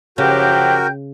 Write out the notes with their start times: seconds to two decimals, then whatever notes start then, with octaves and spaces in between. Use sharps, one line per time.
0.18 F#2 C#3 F3 F#4 G4 A#4 G5 G6